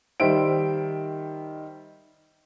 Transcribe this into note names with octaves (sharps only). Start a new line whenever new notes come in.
D#3 G3 C5 E5 D7